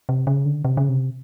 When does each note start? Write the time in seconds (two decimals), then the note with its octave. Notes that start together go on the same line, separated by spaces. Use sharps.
0.09 C3
0.27 C#3
0.45 D3
0.65 C3
0.77 C#3
0.89 C3